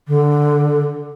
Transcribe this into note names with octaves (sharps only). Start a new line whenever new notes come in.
D3